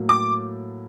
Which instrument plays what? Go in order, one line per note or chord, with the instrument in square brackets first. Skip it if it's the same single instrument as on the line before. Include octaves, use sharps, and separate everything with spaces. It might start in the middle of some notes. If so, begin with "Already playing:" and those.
Already playing: [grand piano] A2 F#3 A#3
[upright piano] D6